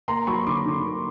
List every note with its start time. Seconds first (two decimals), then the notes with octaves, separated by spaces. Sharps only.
0.08 A#3 A#5 C6
0.27 F#3 B5 C#6
0.47 D3 C6 D6
0.66 D3
0.86 A#3